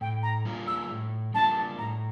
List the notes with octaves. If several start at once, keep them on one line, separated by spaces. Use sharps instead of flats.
A2 G5
A#5
G3 A#3 D4 F4
E6
A2
G3 A#3 D4 F4 A5
A2 A#5